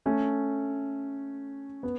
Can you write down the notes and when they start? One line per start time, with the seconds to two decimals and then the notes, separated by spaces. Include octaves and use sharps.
0.06 A3 C#4
1.83 B3